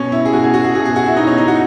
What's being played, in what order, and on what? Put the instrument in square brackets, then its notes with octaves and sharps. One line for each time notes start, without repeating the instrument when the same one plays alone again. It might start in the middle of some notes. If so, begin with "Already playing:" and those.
Already playing: [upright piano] B2 C#4
E4
G#4
B2 F#4
G#4
F#4
G#4
B2 G#4
G#4
F#4
E4
B2 D#4
C#4
D#4
F#4